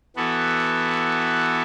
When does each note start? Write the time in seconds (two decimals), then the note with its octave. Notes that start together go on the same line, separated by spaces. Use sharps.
0.16 E3 B3 F#4 A4